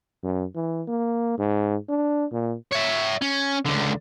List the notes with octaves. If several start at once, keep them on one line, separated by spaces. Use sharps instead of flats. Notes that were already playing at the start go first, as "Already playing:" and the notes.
F#2
E3
A#3
G#2
D4
A#2
C#5 E5
C#4
C#2 D3